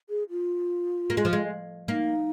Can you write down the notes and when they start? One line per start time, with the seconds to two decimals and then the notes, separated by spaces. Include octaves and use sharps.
0.10 G#4
0.30 F4
1.10 A#3
1.17 G#3
1.25 F3
1.33 G#3
1.88 A#3 D#4